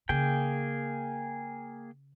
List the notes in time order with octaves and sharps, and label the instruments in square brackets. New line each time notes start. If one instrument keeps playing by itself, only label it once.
[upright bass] C#3 [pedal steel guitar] A#3 G#4 G5